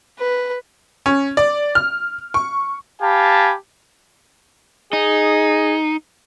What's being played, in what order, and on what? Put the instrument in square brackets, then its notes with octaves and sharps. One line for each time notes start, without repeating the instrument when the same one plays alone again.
[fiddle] B4
[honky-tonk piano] C#4
D5
F6
C#6
[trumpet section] G4 F5 G#5 A5 B5
[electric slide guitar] D#4 [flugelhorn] G#4